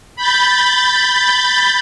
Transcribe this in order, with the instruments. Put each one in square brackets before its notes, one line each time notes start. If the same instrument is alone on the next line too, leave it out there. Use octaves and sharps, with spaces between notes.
[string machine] B5 G6 A6